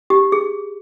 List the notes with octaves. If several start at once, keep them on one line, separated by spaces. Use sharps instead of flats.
G4
G#4